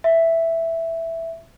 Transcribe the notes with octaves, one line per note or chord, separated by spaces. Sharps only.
E5